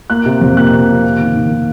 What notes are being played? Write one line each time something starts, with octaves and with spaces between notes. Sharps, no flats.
A#3 F#6
C3
F2
A#3 F#6
C3
C3
A#3
D#3
D#3
D#3